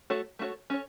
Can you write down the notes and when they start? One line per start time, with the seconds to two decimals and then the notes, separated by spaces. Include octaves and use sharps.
0.10 A3 F#4 A4 C#5
0.39 A3 F#4 A4 C#5
0.70 C#4 A4 C#5